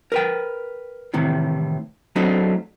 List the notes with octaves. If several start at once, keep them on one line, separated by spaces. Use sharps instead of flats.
A#4 B4 G5
A2 C3 D#3 E3
F#3 A3 C4 D4 D#4